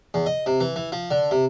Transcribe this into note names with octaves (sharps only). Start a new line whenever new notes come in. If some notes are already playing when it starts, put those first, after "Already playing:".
E2
D#5
C3
E3
E3
F3
D3
C3